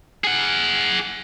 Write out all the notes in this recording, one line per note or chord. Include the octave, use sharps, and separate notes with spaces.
G#4 F#5